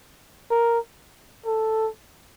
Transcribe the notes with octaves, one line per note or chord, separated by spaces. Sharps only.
A#4
A4